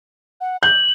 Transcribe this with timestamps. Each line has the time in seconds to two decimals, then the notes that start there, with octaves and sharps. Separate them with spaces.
0.41 F#5
0.63 G6 F#7